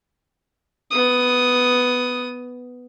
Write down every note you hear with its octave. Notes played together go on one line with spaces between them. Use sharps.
B3 D#6